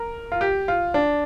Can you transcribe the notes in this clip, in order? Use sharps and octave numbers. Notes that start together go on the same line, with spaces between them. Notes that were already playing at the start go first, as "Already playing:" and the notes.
Already playing: A#4
F4
G4
F4
D4